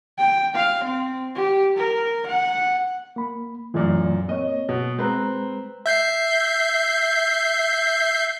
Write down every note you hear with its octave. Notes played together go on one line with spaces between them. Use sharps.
G5
F5
C4
G4
A#4
F#5
A#3 B5
F#2 A#2 E3 A3 D5
A#3 C4 C#5 D#5
B2
G#3 C4 B4 A#5
E5 G6 C7